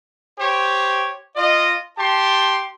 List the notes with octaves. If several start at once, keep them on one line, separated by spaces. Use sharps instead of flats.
G4 C5 C#5
F4 D#5
G4 A5 C6